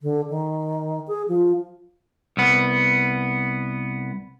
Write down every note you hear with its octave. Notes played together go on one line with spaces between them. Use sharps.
D3
D#3
G#4
F3
C2 B3